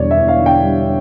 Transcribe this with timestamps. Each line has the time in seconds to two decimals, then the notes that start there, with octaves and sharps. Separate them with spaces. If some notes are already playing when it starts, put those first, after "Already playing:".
Already playing: E1 E2 D3 G3 C#5 D5
0.11 E5
0.16 E2
0.28 F5
0.40 D3
0.46 G5
0.63 G3